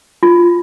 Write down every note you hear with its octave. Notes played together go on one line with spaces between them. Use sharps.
F4